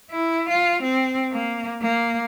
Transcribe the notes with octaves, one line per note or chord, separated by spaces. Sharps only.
E4
F4
C4
A#3
A#3